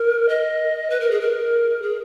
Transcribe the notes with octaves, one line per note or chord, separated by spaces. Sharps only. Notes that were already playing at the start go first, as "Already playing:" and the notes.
Already playing: A#4
D#5
B4
A#4
G#4
A#4
G#4